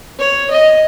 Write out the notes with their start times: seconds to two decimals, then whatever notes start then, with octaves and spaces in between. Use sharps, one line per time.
0.19 C#5
0.51 D#5